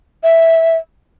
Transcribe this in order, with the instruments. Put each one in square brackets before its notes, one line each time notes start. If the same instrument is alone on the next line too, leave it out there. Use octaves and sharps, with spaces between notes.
[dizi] E5